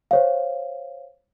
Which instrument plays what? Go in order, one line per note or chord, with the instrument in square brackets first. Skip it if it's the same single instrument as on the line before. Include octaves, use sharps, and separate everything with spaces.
[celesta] C5 C#5 F5